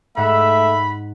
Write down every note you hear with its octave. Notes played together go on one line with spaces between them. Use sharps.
G#2 A3 E5 F#5 B5